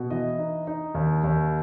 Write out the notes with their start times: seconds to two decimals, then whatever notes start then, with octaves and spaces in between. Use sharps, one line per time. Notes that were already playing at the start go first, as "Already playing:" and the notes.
Already playing: B2
0.10 E3 D#5
0.39 D#4
0.67 D#4
0.94 D#2
1.24 D#2